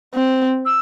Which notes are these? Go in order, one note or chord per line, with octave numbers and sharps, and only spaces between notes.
C4
E6